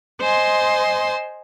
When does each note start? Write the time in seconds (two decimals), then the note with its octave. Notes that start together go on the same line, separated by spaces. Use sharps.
0.20 C5 D#5 G#5 C6